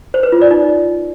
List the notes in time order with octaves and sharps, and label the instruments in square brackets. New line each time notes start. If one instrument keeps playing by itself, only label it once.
[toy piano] C5
B4
F4
D5
D#4